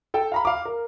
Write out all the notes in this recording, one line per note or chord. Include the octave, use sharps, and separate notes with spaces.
A4 G5
F5 A#5 B5
F5 D6
A#4